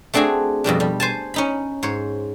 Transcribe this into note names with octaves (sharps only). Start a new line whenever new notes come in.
A3 C4 D4 F#4 G#4
F2 B2 G3 D4
G3
C5 G#5 A5
C#4 D#4 B5
G#2 C5 C#5